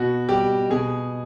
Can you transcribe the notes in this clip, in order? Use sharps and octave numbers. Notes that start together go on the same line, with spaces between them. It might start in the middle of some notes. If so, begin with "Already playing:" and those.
Already playing: B2 F#4
G3 G4
B2 G#4